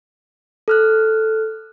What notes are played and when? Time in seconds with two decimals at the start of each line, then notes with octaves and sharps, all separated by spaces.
0.68 A4 F6 F#6